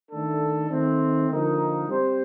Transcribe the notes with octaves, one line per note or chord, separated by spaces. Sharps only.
D#3 A3 D4 A4
D#3 A3 C4
D3 F3 A#3 D#4 A#4
G3 C4 G4 C5